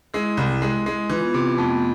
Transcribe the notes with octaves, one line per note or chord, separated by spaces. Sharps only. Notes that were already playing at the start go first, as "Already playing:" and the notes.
G#3 E4 G#4
C2
G#3
G#3
E3 F4
B3
C3 C4
B3
F2 A3
B3